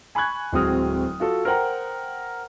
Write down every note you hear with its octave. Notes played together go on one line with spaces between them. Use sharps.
G#5 B5 C#6 F#6 G#6
D1 G#3 C4 F#4 D#6 F6
F4 F#4 A4
A#4 C5 F#5 G5 A#5